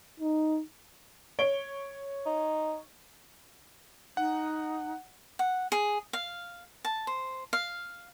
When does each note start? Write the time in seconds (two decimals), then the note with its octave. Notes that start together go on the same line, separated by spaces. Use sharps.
0.20 D#4
1.39 C#5 D7 G7
2.25 D#4
4.17 D#4 F#5
5.39 F#5
5.72 G#4
6.13 F5
6.85 A5
7.07 C5
7.53 F5